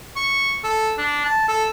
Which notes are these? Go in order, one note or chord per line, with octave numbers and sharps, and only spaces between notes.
C#6
A4
D4
A5
A4